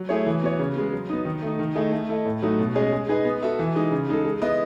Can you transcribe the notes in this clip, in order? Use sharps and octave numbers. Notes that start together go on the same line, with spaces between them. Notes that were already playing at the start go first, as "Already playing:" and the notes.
Already playing: F#3
A3 E4 G#4 C#5
E3
B3 F#4 C#5
C#3
G#3 B3
F#3
B3 D#4
D#3
A3 D#4
D#3
A3 E4 G#4 D#5
A3
E4 A4 D#5
A2
F#3 A3 D#4 F#4
B2
G#3 C#4 G#4 D#5
G#3
D#4 G#4 B4 D#5
B3
F#4 A4 E5
E3
G#3 D#4
C#3
G#3 D#4 A4
G#3
B3 E4 B4 D#5